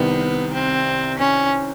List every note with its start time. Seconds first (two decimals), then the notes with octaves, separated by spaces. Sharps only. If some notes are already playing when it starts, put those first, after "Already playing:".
Already playing: C2 C3 D#3 B3
0.54 C4
1.19 C#4